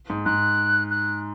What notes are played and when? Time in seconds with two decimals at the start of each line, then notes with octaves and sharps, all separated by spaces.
0.10 G#2
0.25 G#2 F#6
0.90 F#6